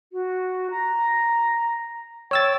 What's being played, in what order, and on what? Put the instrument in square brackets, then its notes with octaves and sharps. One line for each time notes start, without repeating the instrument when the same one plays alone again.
[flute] F#4
A#5
[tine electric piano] C#5 E6 A6 [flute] G5